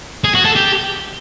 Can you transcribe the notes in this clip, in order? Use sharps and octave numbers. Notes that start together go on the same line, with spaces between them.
G#4
F#4
A4
G4